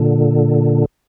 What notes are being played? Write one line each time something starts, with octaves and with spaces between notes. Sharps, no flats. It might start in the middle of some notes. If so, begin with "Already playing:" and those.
Already playing: A#2 D3